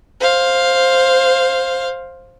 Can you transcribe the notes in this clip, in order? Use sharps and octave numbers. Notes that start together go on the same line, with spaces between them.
C5 F5